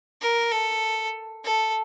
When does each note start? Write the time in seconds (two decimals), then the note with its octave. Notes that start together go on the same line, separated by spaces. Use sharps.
0.21 A#4
0.52 A4
1.44 A4